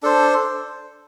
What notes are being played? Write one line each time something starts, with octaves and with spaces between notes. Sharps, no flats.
D4 A4 C5